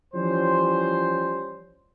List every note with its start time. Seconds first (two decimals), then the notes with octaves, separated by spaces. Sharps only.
0.14 E3 F3 G3 C#4 C5